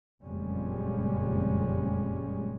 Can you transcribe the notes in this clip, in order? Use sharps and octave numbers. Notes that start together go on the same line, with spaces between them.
F#1 F2 A#2 G3 G#3 C#4